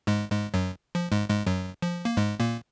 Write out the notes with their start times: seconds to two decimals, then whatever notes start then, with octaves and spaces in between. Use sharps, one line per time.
0.07 G#2 G#3
0.31 G#2 G#3
0.54 F#2 F#3
0.95 F3
1.12 G#2 G#3
1.30 G#2 G#3
1.46 F#2 F#3
1.82 F3
2.05 A#3
2.17 G#2 G#3
2.40 A#2 A#3